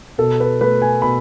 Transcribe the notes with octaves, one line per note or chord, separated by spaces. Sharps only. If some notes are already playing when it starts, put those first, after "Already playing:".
B2 A4
B4
A3 B4
G#5
B2 B5